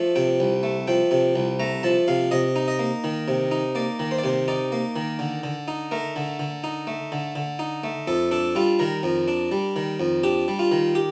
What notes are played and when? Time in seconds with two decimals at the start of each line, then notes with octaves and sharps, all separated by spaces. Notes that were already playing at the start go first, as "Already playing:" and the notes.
Already playing: F3 A3
0.16 C3 G5
0.40 C2
0.63 A3
0.87 F3 G5
1.11 C3
1.36 C2
1.60 A3 A#5
1.83 F3 A5
2.08 C3 F5
2.31 C3 D#5
2.56 D#4
2.68 D#5
2.79 A#3
3.04 D#3
3.28 C3
3.51 D#4
3.75 A#3 D5
3.99 D#3
4.11 C5
4.18 D5
4.24 C3 C5
4.48 D#4 D5
4.72 A#3
4.96 D#3
5.19 D3
5.44 D3
5.68 D#4
5.91 A3 A#4
6.16 D3
6.40 D3
6.64 D#4
6.87 A3
7.12 D3
7.35 D3
7.59 D#4
7.84 A3
8.08 F2 A4
8.31 D4 A4
8.55 G3 F4
8.79 D#3 A#4
9.03 F2
9.28 D4
9.52 G3
9.76 D#3
10.00 F2
10.23 D4 G4
10.48 G3
10.59 F4
10.72 D#3
10.95 G4